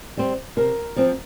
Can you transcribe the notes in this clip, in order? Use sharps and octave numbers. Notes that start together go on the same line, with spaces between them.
G3 C4
C3 A#4
F3 C4